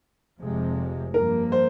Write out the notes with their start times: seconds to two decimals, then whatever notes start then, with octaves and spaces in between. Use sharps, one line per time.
0.40 F1 F2 C3 F3 G#3
1.14 G2 F3 A#3 A#4
1.52 C5